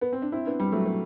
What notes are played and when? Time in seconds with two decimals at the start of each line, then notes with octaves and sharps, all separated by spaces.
0.01 B3
0.12 C4
0.22 D4
0.32 C4 E4
0.46 B3 D4
0.60 G3
0.72 F#3 A3
0.85 F#3